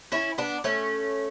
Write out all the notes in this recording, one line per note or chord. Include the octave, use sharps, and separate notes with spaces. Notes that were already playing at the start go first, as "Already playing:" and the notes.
C#4 E4
B3 D4
A3 C#4